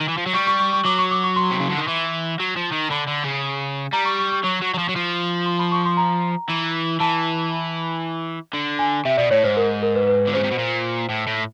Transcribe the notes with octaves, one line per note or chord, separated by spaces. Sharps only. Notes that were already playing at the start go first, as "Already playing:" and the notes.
D#3
E3
F3
F#3
G3 C#6
C#6
C#6
C#6
F#3 D6
C#6
D6
C#6
C6
C3
C#3
D3
D#3
E3
F#3
F3
D#3
D3 B5
D3
C#3
G3 A#5
C#6
C#6
C#6
F#3 C#6
F#3
F#3
F3
F#3
F3
C6
B5
C#6
C6
A#5
E3
E3 A5
D3
G#5
C3 E5
B2 D5
A2 C#5
G#2 C5
A#4
A#4
B4
B4
D3
C#3 C5
C3
B2
A#2
A2
A2